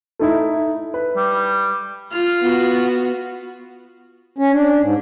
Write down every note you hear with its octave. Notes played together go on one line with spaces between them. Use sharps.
A3 D#4 E4
B4
G3
F4 F6
B3 F#4
C#4
D4
G#2